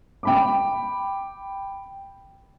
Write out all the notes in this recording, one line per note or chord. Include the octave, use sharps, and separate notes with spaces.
G5 B5 D6